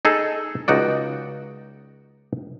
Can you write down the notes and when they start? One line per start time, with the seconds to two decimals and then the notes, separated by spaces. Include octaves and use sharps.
0.05 D#4 G#4 A4
0.68 C#2 D#4 F#4 D5